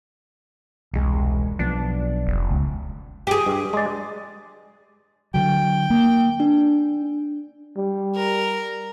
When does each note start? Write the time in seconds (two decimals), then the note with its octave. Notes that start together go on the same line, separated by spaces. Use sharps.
0.94 E1 C2 G#3
1.59 B1 F3 B3 D4
2.27 F1
2.51 C#2
3.27 G4 G#4
3.46 G2
3.73 G#3 D5
5.34 D3 F#3 G5
5.90 A#3
6.40 D4
7.77 G3
8.16 A#4